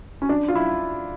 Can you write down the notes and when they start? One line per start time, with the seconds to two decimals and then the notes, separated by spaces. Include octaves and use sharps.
0.22 C#4
0.29 D4
0.48 F4
0.55 E4